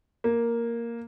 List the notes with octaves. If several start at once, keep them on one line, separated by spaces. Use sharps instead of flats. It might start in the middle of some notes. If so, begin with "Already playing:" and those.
A#3